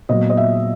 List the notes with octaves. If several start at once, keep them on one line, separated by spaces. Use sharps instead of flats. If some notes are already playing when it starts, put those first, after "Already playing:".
A#2 F#3 B3 D#5
D#5
E5